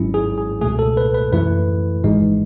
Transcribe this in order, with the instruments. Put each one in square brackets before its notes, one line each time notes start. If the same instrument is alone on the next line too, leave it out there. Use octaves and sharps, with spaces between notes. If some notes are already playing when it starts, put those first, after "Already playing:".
Already playing: [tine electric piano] G#1 G#2 F#3 C#4 E4
G#4
G#4
C#2 B2 A3 G#4
A4
B4
B4
F#2 E3 A3 E4 B4
G#1 G#2 E3 G#3 D#4